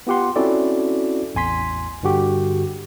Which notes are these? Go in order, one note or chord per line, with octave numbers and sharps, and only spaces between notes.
B3 F4 G4 F#5 C6
C4 C#4 E4 F#4 A4 D5
A1 E2 G#5 C6 B6
G2 D3 F#4 G4